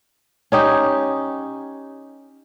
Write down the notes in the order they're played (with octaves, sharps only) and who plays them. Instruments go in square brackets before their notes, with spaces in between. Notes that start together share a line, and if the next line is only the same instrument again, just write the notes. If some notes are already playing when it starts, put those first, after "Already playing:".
[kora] C#4 D#4 G4